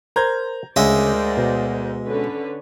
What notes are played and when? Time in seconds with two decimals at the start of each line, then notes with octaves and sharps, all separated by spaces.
0.16 A#4 C5 A#5 G6 G#6
0.76 D2 C#3 G#3 A#4 C5 D5 E5 D#6
1.37 B2
2.06 D3 C#4 B4